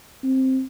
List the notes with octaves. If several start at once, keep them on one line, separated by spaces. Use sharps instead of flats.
C4